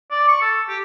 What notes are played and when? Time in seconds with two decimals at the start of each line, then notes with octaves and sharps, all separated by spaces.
0.11 D5
0.28 C#6
0.41 A4
0.69 G4